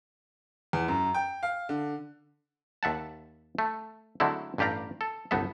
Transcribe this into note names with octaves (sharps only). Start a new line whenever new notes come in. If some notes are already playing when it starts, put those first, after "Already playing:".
E2
F#2
G5
F5
D3
D#2 E5 F#5 A5
A3
D3 F#3 G#3 A3 C4 E4
A1 G2 G4 D5 F5 A#5
A4
G1 C2 B3 A4 E5